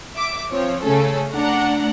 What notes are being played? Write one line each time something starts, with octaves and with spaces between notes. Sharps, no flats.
E5 D6
F3 C4 C#5
C#3 A3 C#4 G#4 A4
A3 D4 F#5 A#5